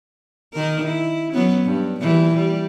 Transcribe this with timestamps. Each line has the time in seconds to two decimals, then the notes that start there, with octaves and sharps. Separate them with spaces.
0.53 D#3 A#4
0.85 E4
1.33 F#3 B3 C#4
1.65 G2
2.01 A#2 E3 G3
2.36 G3